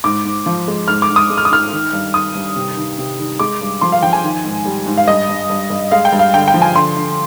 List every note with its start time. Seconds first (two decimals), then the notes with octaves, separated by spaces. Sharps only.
0.04 G#2 D6
0.25 G#2
0.46 F3
0.68 G#3
0.88 G#2 F6
1.02 D6
1.09 G#2
1.16 D#6
1.30 G#3
1.37 F6
1.45 D#6
1.51 G#2 F6
1.72 D#3
1.93 G2
2.14 D#3 D#6
2.35 G2
2.56 C3
2.77 D#3
2.98 C3
3.19 D#3
3.39 G#3 D6
3.61 G2
3.81 F3 C6
3.92 F5
4.03 F3 G5
4.13 G#5
4.24 D#3
4.44 G#2
4.65 G3
4.86 G#2
4.98 F5
5.08 G2 D#5
5.29 G2
5.50 G2
5.70 G2
5.92 G#3 F5
6.05 G5
6.12 G2
6.19 F5
6.34 D3 G5
6.48 G5
6.54 F3
6.62 G#5
6.75 D3 C6
6.97 D3